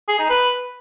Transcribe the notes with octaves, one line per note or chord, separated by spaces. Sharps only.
G#4
D#4
B4